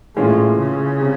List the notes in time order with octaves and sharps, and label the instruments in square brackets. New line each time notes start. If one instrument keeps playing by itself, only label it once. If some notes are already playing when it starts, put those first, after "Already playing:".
[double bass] A2 [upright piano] E3 G#3 C#4 F4
[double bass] C#3
[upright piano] C3